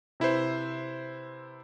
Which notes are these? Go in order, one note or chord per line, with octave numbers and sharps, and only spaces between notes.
C3 E4 B4 C5